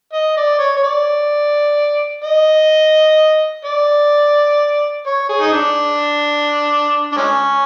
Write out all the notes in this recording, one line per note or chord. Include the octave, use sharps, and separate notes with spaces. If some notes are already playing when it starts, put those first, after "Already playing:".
D#5
D5
C#5
C#5
D5
D#5
D5
C#5
G#4
D#4
D4
D4
G#3 C#4